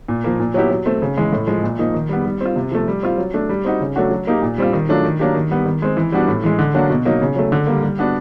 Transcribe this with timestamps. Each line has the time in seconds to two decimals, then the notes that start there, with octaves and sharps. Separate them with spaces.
0.08 A#2
0.24 F3 A#3
0.40 A#2
0.54 F#3 B3 E4 G4
0.70 F#3
0.86 A3 C4
1.02 C#3
1.17 E3 G#3
1.33 A2
1.47 F3 G#3
1.63 A#2
1.79 F3 A#3 D#4
1.94 D#3
2.09 G3 B3
2.25 G3
2.41 C4 F4
2.56 C3
2.72 F3 A3
2.88 G3
3.03 C4 F4
3.18 F#3
3.34 A3 D4
3.49 G3
3.65 C4 D#4 F#4
3.81 C#3
3.96 F#3 A3 D4 F#4
4.11 F#3
4.27 A#3 D#4 G4
4.42 A#2
4.58 G3 C4 F4
4.73 D#3
4.89 F#3 A3 D4 F4
5.04 D#3
5.19 F#3 A#3 D4 G4
5.35 D#3
5.51 G3 B3
5.66 D#3
5.82 G#3 C4
5.97 E3
6.12 G3 B3 D4 F#4
6.28 A2
6.44 E3 G#3
6.59 D3
6.74 F#3 A#3 D4 F#4
6.90 B2
7.05 F#3 A#3 D#4
7.22 C#3
7.36 F#3 A3
7.52 D3
7.67 G3 A#3
7.83 G3
7.99 B3 D4 F#4